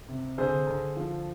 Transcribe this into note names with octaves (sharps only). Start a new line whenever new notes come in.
C3
D3 G#4 C5
D3
F3